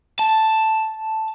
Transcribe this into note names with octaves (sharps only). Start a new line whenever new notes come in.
A5